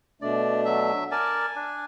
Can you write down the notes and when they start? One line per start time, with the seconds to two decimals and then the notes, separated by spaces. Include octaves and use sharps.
0.22 B2 A3 D4 D5
0.65 F#3 E5
1.11 A#4 D5 G#5 A5
1.56 D4